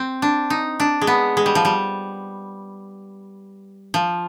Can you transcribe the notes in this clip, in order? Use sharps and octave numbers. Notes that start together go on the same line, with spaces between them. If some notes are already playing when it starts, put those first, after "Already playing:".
Already playing: C4
D4
D#4
D4
G#3
B3
G#3
G3
F3
G3
F3